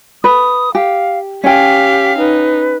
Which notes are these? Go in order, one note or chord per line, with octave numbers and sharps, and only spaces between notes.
B4 D#6
G4 F5
C#4 G4 F5 G5 B6
D#4 B4